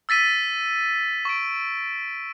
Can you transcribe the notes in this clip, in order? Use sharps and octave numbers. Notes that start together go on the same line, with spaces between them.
E6 A6 B6 D#7
C#6 D7